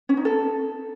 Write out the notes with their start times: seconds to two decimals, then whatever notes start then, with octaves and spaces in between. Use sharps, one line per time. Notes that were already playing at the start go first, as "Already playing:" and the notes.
0.09 C#4
0.17 D#4
0.25 A4